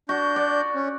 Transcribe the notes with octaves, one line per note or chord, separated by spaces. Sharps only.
D4 F#4 G6
D5
C#4